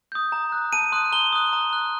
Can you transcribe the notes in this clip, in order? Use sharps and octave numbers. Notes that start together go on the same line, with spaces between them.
D#6 G6
A#5
F#6
A5 D#7
C6 D#6 F#6
A#5 G7
D#6 F#6
A#5
F#6